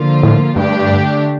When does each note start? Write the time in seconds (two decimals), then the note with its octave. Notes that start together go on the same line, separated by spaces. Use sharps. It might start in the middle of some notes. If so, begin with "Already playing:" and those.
Already playing: D3 F3 A#3 F4
0.23 A2
0.56 G2 D3 A3 D4 G4